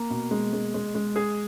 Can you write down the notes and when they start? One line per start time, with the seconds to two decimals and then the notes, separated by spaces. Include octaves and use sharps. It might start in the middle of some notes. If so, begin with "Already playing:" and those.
Already playing: A#3
0.10 B2
0.31 G#3
0.53 G#3
0.74 G#3
0.95 G#3
1.16 G#4